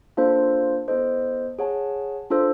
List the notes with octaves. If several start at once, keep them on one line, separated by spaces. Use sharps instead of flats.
A#3 D4 F4 A4 C5
B3 E4 A4 C5 D#5
G#4 C#5 F#5 A5
D4 F4 A4 C5